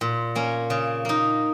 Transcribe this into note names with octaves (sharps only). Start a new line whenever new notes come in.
A#2
A#3 C#4
C#3
A#3 D#4